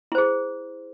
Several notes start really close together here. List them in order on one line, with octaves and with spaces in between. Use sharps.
E4 C5 G#4